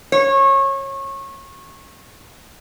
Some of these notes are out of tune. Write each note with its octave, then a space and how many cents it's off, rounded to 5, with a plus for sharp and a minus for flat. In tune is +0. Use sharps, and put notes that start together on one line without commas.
C#5 -25